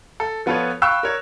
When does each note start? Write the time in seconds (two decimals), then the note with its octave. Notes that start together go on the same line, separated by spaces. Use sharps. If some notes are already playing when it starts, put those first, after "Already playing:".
0.20 A4
0.46 F3 B3 F4 A4 B4 C#5
0.82 F5 G5 B5 C#6 E6 F#6
1.03 A#4 C#5